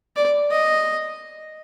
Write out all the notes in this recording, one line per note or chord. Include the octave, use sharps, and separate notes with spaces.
D5
D#5